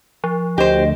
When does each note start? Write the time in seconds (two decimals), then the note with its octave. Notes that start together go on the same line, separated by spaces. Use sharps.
0.24 F3
0.58 D2 G4 C5 D#5